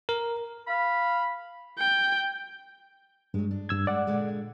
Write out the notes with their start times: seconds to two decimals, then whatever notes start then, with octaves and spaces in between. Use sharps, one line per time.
0.09 A#4
0.67 F5 B5
1.78 G5
3.34 G2 F#3 G#3
3.51 D4
3.69 G2 E6 G#6
3.87 G#3 D5 F#5
4.07 A#2 D3 G#3